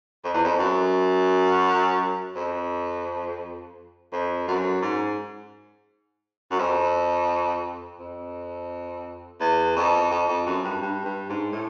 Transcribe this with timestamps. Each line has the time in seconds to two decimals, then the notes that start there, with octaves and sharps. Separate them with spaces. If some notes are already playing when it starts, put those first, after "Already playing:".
0.24 F2
0.34 E2
0.45 F2
0.59 F#2
2.36 F2
4.12 F2
4.48 F#2
4.82 G#2
6.51 F#2
6.59 F2
8.00 F2
9.40 E2
9.76 F2
10.11 F2
10.29 F2
10.46 F#2
10.64 G2
10.82 G2
11.05 G2
11.29 G#2
11.52 A2